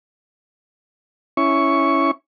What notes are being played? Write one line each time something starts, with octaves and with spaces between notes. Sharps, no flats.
C#4 E4 C#6